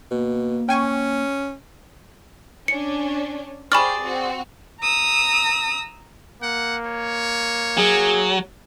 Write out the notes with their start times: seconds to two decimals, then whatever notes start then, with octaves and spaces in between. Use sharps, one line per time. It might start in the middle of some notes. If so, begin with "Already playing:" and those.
0.11 B2 A#3
0.69 C#4 G5 G#5 C#6
2.68 C#4 D4 C#7
3.72 G4 G#4 C5 D5 B5 C#6 F6
4.02 C4 F#4
4.81 A#5 D#6 E6
6.42 A#3 F#5
6.86 C#5
7.77 F#3 G#4